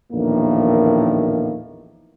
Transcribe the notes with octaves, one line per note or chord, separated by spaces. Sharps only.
A#1 E2 A2 D#3 A#3